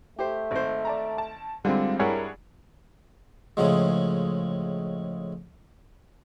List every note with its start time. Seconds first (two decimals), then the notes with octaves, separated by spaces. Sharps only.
0.19 A3 G4 C5
0.51 G#1 C5
0.85 D5 A5 A#5
1.18 A5
1.65 D3 G3 G#3 C4 F4
1.99 G2 E4 G#4 A#4 C#5 F#5
3.57 A2 C#3 F3 G#3